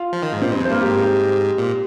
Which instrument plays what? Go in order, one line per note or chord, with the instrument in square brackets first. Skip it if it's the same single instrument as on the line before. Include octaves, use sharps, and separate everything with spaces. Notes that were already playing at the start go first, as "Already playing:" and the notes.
Already playing: [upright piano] F4 F5
[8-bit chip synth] F3
D#3
G#2
[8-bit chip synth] A#2 [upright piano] C4 C5
[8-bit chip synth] G2
F2
[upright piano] C5
[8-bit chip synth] G2 [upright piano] A#3 A#4
[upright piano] G4
[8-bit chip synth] G#2
[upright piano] G4
[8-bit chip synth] A#2